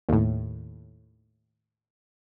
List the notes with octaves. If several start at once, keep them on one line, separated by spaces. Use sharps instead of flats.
D#2 A2